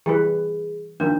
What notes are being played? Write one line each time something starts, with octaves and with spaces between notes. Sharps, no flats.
E3 G3 G#4 B4
D#3 F3 A#3 D4